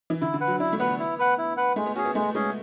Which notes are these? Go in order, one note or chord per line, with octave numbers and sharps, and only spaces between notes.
E3
D3 E4
D3
B4 F#5
F#3
D4 E4
A3
B3 B4 F#5
E4
B4 F#5
E4
B4 F#5
G#3 A3
B3
C#4 F#4 G#4
B3
G#3 A3
G#3 C#4 G#4